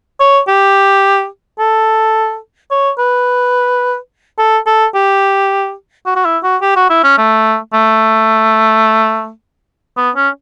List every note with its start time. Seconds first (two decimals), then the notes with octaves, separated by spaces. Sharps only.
0.20 C#5
0.48 G4
1.59 A4
2.71 C#5
2.99 B4
4.39 A4
4.66 A4
4.95 G4
6.06 F#4
6.16 F#4
6.25 E4
6.43 F#4
6.62 G4
6.76 F#4
6.90 E4
7.04 C#4
7.18 A3
7.74 A3
9.97 B3
10.16 C#4